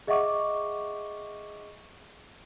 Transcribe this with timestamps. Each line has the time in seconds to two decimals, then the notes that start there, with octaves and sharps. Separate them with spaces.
0.07 G#4 D#5 E5 F#5 C#6 D6